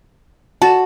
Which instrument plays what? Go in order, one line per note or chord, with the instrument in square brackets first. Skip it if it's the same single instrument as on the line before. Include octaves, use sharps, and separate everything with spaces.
[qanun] F#4 [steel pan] A5